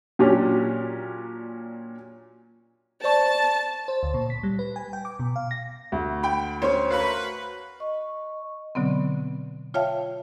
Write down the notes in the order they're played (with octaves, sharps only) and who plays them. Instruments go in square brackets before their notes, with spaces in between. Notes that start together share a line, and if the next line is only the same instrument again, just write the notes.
[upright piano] A#2 F#3 C#4 D4 G4
[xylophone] C5 D5 C#6 [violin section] A5
[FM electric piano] C5
D2
A#2
B6
G3
B4
G#5
G5
D6
B2
F5
A#6
[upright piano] D2
[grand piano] G5 B5
[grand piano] C#4 [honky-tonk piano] C5 C#5
[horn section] F#4 A#4 B4 [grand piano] F5 B5
[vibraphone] D#5 C#6
[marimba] B2 D3 F#3 B3 C4
F4 C#5 E5 F5 G5 A5